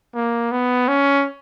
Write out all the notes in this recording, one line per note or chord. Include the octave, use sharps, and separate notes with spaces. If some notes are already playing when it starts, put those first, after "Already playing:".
A#3
B3
C#4